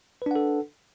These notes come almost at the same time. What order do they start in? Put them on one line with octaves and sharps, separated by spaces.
B4 D4 F#5 A4